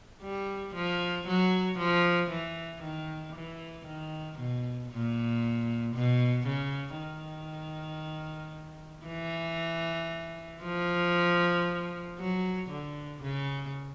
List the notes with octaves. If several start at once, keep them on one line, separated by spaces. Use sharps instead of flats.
G3
F3
F#3
F3
E3
D#3
E3
D#3
B2
A#2
B2
C#3
D#3
E3
F3
F#3
D3
C#3